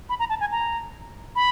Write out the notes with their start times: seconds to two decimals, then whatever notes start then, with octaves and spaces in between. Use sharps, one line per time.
0.09 B5
0.19 A#5
0.30 A5
0.40 G#5
0.52 A#5
1.36 B5